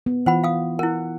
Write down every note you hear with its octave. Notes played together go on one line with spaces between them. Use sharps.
B3
E3 F4 C5 F#5 B5
F5 D#6
E4 A#4 F#5